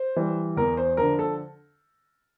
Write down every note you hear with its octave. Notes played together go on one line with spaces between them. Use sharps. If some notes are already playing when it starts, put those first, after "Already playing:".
Already playing: C5
E3 G3
E2 A#4
C5
D3 F3 A#4
A4